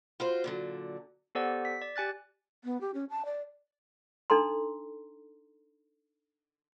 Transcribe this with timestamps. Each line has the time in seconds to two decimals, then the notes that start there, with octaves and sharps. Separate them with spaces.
0.20 F4 F#4 C5
0.44 A#2 D3 F#3
1.35 B3 G4 A4 C5 D5 F#5
1.65 B6
1.82 D5
1.96 G4 G#5 F#6 A6
2.64 B3
2.81 G4
2.94 C#4
3.10 A5
3.25 D5
4.30 D4 D#4 A4 A#5 C6